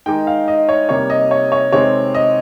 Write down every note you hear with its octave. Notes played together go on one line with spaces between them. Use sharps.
D#3 G#3 D#4 G5
F5
D#5
C#5
C3 G3 A#3 D#4 C#5
D#5
C#5
C#5
C3 D#3 G#3 C4 C#5
D#5